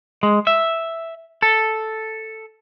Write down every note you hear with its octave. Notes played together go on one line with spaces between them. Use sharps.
G#3
E5
A4